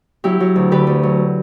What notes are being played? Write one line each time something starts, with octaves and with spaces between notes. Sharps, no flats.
F#3 E4 G4
F#3
D2
D3 G4 B4
D2
F#3